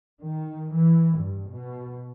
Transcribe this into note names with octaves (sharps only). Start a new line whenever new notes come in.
D#3
E3
G2
B2